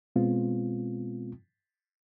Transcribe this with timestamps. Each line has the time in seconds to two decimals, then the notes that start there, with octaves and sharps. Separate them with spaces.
0.16 B2 G#3 B3 C4 F4